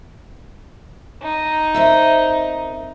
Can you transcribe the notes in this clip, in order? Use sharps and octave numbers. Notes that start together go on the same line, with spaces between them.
D#4
C4 A#4 E5